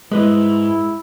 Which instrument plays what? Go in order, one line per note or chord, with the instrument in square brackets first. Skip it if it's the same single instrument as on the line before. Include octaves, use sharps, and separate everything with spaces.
[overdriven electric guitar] G#2 [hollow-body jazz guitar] G#3 B4 D#5 [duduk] E4